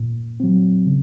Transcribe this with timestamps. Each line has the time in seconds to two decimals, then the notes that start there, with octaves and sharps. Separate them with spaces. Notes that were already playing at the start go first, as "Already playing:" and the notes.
Already playing: A#2
0.40 F#3 C4
0.87 C#3